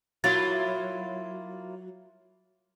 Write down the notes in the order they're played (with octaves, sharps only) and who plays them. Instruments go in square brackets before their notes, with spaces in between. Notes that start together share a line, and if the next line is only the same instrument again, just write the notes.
[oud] F#3 [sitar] A#3 E4 F4 [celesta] A6